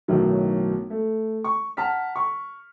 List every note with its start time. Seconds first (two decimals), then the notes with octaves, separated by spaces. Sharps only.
0.08 B1 A2 D#3 F#3
0.90 A3
1.44 C#6
1.77 F#5 A5 A#5 F6 B6
2.16 C#6